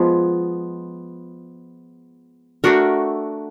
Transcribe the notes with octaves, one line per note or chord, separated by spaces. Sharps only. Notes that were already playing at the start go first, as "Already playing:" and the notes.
Already playing: F3 G#3 B3
A3 D4 F#4 A#4